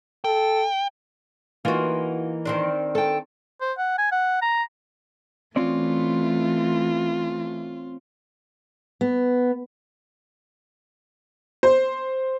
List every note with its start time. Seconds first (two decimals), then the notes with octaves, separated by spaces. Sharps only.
0.24 A4 G5
1.65 E3 A#3 D#4 F4 F#4
2.45 D#3 C4 D4
2.95 A4 G5
3.61 C5
3.78 F#5
3.98 G#5
4.12 F#5
4.42 A#5
5.56 E3 A3 C4 C#4 F4 D5
9.01 B3
11.63 C5